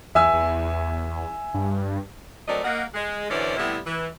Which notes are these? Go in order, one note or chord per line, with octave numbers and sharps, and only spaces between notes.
E2 E5 G#5 E6
E2
G2
F#3 A3 C4 A#4 D5 D#5
A#3 D#5 F#5
G#3
F#2 D3 E3 C#4 C5 D5
A2 C3 G3 B3 E4
E3